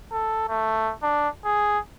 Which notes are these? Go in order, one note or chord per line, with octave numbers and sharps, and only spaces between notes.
A4
A3
D4
G#4